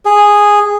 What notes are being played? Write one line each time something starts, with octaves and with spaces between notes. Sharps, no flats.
G#4